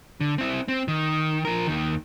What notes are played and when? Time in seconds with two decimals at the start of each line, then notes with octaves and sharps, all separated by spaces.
0.21 D3
0.38 C4 E4
0.68 C4
0.88 D#3
1.45 F3 A#4
1.67 D#2 D#3